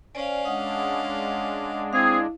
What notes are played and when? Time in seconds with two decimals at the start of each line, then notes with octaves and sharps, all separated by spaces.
0.15 C#4 C5 D5 F5 G#5
0.45 G#3 D4 D#5 F#5 D#6
1.93 C4 E4 G#4 F5